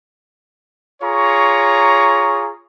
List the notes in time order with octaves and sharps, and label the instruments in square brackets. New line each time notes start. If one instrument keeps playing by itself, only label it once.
[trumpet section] F4 G#4 C#5 A#5 C#6